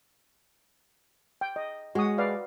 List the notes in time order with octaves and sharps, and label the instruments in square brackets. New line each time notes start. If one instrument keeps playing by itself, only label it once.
[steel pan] G5
D#5
[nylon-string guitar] G#3 [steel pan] F#4 D#6
[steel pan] B4 D5 F5